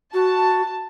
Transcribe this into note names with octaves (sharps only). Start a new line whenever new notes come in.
F#4 A5